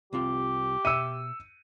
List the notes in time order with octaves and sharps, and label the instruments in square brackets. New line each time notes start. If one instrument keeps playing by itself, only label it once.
[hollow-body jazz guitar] C2 C4 F4 [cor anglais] G4
[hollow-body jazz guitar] B2 E5 [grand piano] E6 C#7 D#7